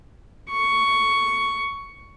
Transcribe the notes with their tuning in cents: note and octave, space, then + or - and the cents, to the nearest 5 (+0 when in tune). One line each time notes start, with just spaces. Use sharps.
C#6 +10